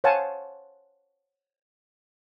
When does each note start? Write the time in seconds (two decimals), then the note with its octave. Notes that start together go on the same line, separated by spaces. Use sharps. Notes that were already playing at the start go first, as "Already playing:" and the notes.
0.04 C5 C#5 F5 F#5 G#5 A5